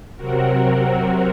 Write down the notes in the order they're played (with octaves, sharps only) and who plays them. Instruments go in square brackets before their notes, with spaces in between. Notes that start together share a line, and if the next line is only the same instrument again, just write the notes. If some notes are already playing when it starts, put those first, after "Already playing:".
[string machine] C3 F#3 C4 F#4 A#4